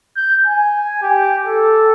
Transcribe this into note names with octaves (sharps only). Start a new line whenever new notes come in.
G6
G#5
G4
A4